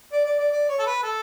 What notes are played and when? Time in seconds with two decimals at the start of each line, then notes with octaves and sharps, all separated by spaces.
0.12 D5
0.25 D5
0.38 D5
0.52 D5
0.69 C#5
0.79 A4
0.86 B4
1.03 A4